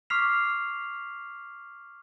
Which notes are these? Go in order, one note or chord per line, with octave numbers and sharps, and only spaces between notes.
C#6 D6 F6 B6 C7 F7